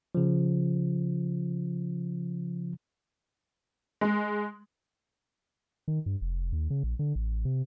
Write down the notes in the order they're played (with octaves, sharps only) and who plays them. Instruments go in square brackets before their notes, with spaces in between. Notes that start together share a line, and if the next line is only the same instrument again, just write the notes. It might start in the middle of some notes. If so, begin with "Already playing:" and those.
[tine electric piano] C#3 F3
[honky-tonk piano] G#3
[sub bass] D#3
G2
F1
D#2
C#3
A#1
D3
A1
C3